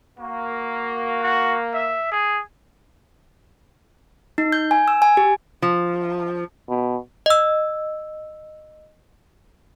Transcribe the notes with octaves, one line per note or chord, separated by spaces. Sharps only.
A#3 F#4
F#4
E5
G#4
D#4
G6
G#5
E6
G#5
G4
F3
B2
D#5 E6